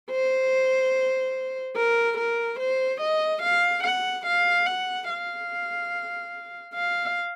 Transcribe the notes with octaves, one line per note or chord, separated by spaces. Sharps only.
C5
A#4
A#4
C5
D#5
F5
F#5
F5
F#5
F5
F5